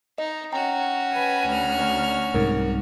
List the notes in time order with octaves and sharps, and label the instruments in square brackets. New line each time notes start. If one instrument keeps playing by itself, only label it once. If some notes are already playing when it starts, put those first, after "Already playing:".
[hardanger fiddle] D#4 [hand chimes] D#5
[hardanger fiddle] C#4 F#4 [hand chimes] G5 A#5
[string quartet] B4 G#5
D2 F6
[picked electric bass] C2 G#2 [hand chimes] A#4